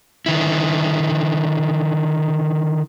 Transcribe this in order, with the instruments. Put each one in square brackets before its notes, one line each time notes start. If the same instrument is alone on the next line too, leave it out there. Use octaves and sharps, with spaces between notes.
[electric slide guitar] D3 D#3 E4